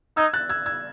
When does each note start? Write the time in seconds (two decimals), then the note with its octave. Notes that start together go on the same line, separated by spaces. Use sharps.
0.17 D#4 E6 G#6
0.34 F#6 A6
0.50 E6 G#6
0.66 E6 G#6